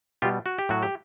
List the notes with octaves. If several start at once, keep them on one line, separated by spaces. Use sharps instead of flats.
B2 G3 F4 G4
F#4
G4
A2 F#3 F#4
G4